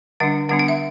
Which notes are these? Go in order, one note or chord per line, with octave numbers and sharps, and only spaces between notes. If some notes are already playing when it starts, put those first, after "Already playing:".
D3 G3 D4 F#5
D3 G3 B3 D4 F#5
F#5
E5